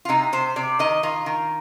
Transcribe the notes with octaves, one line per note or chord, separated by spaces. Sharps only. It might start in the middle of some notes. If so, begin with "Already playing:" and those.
F4
C3 D#4
C3 C5
C3 D5
D#3 D#5
D#3 F4
D#3